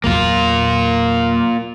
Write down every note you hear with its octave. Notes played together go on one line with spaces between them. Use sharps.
E2 F#3 A#3 F4